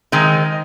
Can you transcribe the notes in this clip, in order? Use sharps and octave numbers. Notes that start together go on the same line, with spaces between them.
D#3 G#3 C4 D#4